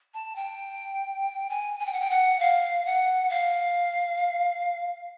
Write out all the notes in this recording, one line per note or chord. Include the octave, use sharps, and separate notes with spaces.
A5
G5
G#5
G#5
G5
F#5
G5
F#5
F5
F#5
F5